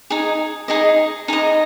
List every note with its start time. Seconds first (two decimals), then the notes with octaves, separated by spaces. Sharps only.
0.10 D#4 G#4
0.68 D#4 G#4 D#5
1.28 D#4 G#4 D#5